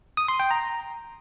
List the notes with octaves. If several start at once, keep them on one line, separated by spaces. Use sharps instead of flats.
D#6
C6
G5
A#5